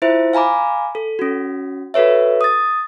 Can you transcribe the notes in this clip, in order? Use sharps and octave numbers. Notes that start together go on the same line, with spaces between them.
E4 F4 C5 E5
F5 G#5 A#5 B5 D6
A4
C#4 F#4
F#4 A4 B4 C#5 E5
D#6 A6